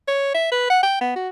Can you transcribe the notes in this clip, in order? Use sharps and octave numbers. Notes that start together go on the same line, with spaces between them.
C#5
E5
B4
F#5
G5
B3
F#4